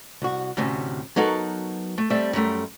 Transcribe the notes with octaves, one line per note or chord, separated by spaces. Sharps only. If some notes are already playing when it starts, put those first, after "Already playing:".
C2 F#4
D2 A2 C3 C#4
F#3 B3 D#4 F#4 A4 A#4
A3
G3 A3 C4 A4 E5
F#2 G3 A3 A#4